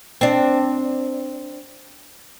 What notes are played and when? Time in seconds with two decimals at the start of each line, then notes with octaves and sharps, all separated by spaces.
0.21 C4 D4